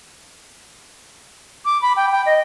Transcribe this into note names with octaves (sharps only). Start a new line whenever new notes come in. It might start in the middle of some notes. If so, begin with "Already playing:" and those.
D6
B5
G5
G5
D#5